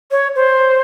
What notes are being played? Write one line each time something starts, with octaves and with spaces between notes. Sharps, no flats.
C#5
C5